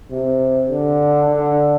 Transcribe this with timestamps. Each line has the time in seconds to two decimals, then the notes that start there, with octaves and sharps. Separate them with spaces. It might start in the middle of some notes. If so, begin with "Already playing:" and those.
0.11 C3
0.70 D3
1.29 D3